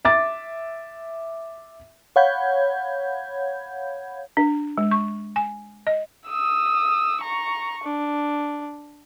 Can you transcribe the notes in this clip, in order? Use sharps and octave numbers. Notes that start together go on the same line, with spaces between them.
E5 D6 A6
C#5 F5 F#5 B5 G6 G#6
D4
G#3
C#6
G#5
D#5
D#6 E6
A#5 C#6
D4